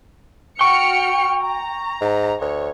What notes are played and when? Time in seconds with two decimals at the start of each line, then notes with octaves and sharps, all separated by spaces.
0.61 F#4 G5 C#6 F6 C#7
1.43 A#5
2.01 G#2
2.41 D2 C#5